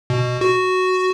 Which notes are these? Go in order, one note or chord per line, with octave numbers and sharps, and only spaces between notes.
B2
F#4